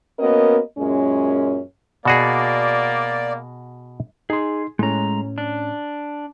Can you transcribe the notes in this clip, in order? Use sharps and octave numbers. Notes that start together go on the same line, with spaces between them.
A#3 B3 C#4 F#4 A#4 D#5
F#2 A#2 G#3 C#4
B2 A#3 F#4 G#4 D5
D#4 G#4 C6
A2 G#3 C#4 A#5
D4